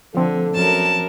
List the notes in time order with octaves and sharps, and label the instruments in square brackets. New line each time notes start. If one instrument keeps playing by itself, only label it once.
[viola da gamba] D3 [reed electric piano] F3 C4 [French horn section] A3 D4 A4
[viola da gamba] F#2 A#4 [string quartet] A5